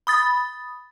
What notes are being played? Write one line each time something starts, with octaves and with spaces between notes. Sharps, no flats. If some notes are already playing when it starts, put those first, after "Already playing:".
B5 D#6 A6